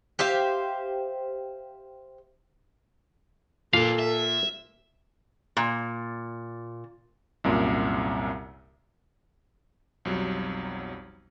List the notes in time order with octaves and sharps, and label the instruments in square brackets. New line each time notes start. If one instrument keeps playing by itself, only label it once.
[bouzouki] G4 C5 E5 F5
[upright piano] A#2 [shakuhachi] A4 [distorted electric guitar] B4 D5 [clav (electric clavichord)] F5
[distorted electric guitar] E5
[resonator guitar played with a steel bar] A#2
[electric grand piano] C2 F#2 A#2
B1 F2 F#3 G3